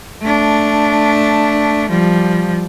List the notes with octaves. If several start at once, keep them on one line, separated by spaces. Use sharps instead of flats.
A3 D4
F3 G3